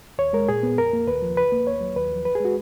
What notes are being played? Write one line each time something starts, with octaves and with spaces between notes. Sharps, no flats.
D#2 C#5
G#3 A#4
A#2 G#4
B3
F2 A#4
A#3
D#2 B4
F3
C#2 B4
A#3
D#2 C#5
F#3
D#2 B4
F3
C#2 B4
G#4
G#3 F#4